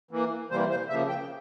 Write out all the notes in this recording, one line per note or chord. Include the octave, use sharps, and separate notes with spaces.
E3 A#3
C3 E3 G3 A#3 C5
C5
C#3 F3 A#3 E5
G5